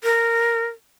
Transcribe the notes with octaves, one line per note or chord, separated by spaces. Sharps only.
A#4